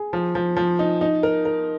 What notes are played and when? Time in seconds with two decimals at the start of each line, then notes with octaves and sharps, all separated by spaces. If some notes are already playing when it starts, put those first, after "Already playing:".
Already playing: G#4
0.13 F3
0.35 F3
0.56 F3
0.79 D#4
1.01 D#4
1.23 A#4
1.45 A#4